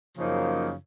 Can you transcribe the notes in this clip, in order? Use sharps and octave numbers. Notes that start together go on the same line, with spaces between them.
F#2 C#3 F3 A#3 D#4